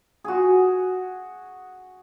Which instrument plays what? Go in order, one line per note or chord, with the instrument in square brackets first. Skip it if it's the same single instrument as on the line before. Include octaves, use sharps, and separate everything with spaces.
[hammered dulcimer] F#4 G#4